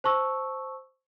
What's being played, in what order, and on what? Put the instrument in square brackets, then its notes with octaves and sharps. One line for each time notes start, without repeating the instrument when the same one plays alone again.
[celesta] C5 A5 C#6 E6